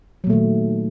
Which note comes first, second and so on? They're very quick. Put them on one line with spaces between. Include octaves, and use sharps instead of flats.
F#3 A#2 A3 D#3